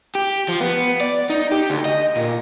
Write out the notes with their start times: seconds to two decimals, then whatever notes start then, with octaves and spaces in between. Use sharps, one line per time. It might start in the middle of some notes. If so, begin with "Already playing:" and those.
0.15 G4
0.48 F3
0.61 B3
1.01 D5
1.30 D#4
1.52 G4
1.70 D2
1.85 D#5
2.16 A#2